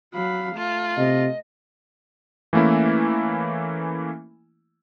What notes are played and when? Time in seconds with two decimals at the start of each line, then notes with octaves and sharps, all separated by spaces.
0.15 F#3 F5 B5
0.56 A3 F4
0.97 C3 D#5
2.53 E3 A3 A#3 C#4 E4